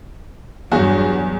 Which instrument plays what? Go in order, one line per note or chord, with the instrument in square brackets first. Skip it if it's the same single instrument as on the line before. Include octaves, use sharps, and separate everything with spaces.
[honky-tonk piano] E2 [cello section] G2 F#3 [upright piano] F#4